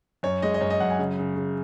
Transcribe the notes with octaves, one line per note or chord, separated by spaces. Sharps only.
F#2 C#5
G#3 D#5
D#5
F#2 C#5
D#5
F#2 F#5
G#5
C#3
C#3
C#3